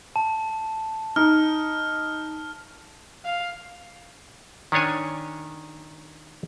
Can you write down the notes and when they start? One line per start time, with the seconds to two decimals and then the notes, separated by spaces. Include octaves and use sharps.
0.16 A5
1.16 D#4 F6
3.25 F5
4.72 D#3 C#4 D4 C#5 G#5